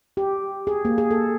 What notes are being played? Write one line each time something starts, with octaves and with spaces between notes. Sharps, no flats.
G4
G#4
A#3
G#4
A4